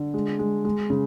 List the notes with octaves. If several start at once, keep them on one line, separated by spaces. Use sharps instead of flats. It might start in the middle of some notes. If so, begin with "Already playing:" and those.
Already playing: D3
G#3
G#3
G#3
C#3